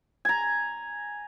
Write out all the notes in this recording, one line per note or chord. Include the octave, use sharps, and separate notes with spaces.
G#5 A#5